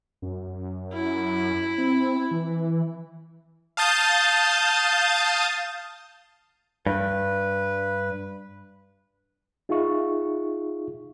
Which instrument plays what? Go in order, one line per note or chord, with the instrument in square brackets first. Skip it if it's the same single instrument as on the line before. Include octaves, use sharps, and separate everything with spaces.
[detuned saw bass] F#2
[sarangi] E4
[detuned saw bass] C4
E3
[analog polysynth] F5 A5 D#6 G6 A6
[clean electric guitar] G2 [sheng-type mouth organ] B4
[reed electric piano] D#4 F4 G#4 E5 F5 C#6